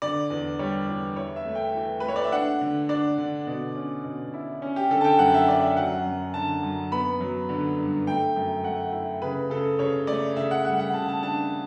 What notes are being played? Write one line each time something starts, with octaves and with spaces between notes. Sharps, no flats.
D3 D5
E2
G3 C#5
E2
E4 C#5
E5
A3
G5
E3
B4
A3
C#5
D5
E5
D4 F#5
D3
D4 D5
D3
B2
C#4
B2
E4
C#4
G4
D3 A4
A5
G5
F#2 F#5
E5
C#4 D5
E5
F#3 F#5
F#2
D3 A5
F#2
B3 B5
F#3
D3
G2
A3 G5
F#2
A3 F#5
E4
C#3 B4
C#3 A4
C#3 C#5
A3 D5
C#3 E5
F#5
G3 F#5
F#5
C#3 A5
A5
D4 A5